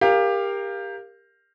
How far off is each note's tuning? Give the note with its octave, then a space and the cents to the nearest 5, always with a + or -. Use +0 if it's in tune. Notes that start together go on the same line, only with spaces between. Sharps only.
G4 +20 A#4 +0 F5 +0